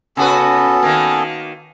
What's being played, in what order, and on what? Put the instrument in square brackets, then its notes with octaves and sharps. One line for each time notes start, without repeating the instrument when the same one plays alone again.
[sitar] C#3 F#4 B4 [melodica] B3 C#4 A4
[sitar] D#3 A#3